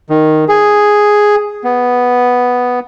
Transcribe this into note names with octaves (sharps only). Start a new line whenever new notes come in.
D#3
G#4
B3